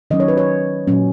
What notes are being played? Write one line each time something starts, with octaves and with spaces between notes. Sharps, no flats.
D#3 F#3 C#4 D#5
C#5
B4
C#5
A#2 F#3 C#4